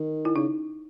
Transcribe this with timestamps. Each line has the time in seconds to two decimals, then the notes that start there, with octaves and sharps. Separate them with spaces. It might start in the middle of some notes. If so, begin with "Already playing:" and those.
Already playing: D#3
0.25 E4
0.36 C#3 D#4